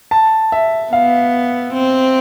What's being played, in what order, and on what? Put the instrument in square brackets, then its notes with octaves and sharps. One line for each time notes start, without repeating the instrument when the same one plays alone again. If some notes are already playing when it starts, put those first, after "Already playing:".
[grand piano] A5
E5
[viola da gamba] B3 [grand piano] F5
[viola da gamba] C4